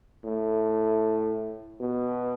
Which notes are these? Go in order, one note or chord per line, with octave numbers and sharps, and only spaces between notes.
A2
B2